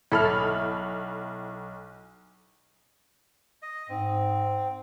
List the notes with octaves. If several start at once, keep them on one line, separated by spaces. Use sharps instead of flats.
B1 E4 A4 B5 F6
D#5
G#2 C4